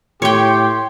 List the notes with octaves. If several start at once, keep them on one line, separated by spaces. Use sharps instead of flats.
A2 G4 C#5 G5 C6